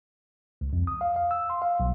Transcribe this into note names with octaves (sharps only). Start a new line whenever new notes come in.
C#2
F2
D#6
F5
F5
E6
C6
F5
B1